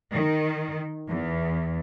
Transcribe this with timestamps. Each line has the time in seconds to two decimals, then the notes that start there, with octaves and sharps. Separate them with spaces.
0.13 D#3
1.07 E2